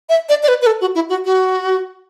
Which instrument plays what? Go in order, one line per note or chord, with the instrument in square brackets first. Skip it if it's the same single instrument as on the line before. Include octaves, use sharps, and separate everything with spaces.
[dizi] E5
D5
D5
B4
B4
A4
F#4
E4
F#4
F#4